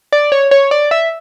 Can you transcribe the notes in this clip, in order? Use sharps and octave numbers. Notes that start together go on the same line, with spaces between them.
D5
C#5
C#5
D5
E5